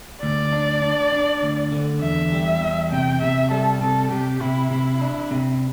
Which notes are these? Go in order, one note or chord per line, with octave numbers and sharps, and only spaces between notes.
D2 D5
D4
D4
D4
D2
D3
E2 E5
G3
E2
C3 G5
C3 E5
G3 A4
C3 A4
C3 G4
C3 E4
C3 E4
D4
C3